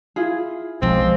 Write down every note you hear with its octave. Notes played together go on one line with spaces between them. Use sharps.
E4 F4 G#4
B1 B2 F3 G#3 C4